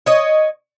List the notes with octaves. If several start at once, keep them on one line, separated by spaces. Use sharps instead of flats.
C#5 D#5